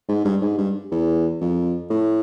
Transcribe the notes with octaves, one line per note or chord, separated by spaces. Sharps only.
G#2
G2
G#2
G2
E2
F2
A2